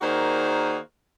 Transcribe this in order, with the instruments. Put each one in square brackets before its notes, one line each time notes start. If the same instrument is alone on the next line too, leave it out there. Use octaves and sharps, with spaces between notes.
[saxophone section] D#3 A#3 F#4 G#4 C5 D5